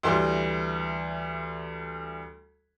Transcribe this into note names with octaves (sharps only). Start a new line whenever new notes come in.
D2 E3 G3 C6